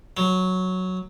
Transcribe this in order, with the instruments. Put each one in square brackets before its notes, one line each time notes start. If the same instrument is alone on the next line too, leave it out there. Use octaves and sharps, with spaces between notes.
[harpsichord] F#3